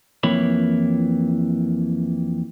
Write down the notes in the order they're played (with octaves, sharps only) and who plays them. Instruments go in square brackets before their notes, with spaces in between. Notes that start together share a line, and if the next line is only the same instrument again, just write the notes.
[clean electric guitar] F2 E3 A#3 E4 C#5 B5